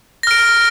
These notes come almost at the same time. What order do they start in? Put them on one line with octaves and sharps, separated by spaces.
A#6 F6 D7